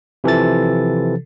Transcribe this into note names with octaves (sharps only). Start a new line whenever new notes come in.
C3 E3 F3 A4 A6